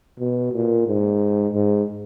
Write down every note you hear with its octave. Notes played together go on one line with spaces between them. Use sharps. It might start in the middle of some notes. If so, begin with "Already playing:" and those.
B2
A#2
G#2
G#2